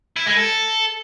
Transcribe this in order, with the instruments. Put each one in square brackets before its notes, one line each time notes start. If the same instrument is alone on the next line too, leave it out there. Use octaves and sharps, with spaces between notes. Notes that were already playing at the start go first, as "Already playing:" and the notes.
[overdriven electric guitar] E4
G#3
A4